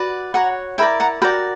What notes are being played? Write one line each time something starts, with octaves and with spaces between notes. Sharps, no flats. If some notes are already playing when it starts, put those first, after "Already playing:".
Already playing: F#4 B4 D5
F#4 C#5 F#5 A#5
E4 A#4 D5 G5 B5
F#5 A#5
F#4 A#4 D5 G5 B5